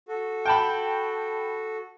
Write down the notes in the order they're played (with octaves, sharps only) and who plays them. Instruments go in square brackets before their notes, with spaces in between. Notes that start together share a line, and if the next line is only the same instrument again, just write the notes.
[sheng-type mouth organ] F#4 A4
[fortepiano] G5 A5 B5